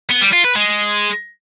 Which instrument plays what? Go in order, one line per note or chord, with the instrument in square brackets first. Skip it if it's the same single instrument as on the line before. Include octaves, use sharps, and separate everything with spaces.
[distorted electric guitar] B3
G3
F4
B4
G#3